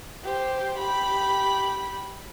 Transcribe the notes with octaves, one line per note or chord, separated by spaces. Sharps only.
G4 C5
G4 B5